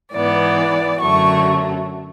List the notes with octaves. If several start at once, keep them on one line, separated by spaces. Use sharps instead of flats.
G#2 E3 B3 D5
F#2 D3 F#3 A3 C#6